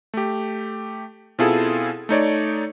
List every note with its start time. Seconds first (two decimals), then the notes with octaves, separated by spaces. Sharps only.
0.14 A3 G4
1.39 B2 C4 E4 F4 G#4 A4
2.09 A3 D#4 C#5 D5